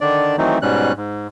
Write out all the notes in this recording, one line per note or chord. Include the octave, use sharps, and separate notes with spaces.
D3 D#3 D4 D5
D#3 E3 F#3 A3 C4 D#4
G#2 B2 G3 C#4 F#6
G#2